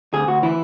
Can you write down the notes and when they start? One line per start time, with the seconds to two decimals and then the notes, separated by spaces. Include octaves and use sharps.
0.13 D2 G#4
0.27 D2 F#4
0.43 E3 E4